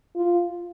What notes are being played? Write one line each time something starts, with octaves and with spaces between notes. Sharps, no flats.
F4